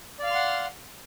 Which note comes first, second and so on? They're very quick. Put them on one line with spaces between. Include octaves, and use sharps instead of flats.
D5 F5 F6 C6 F#5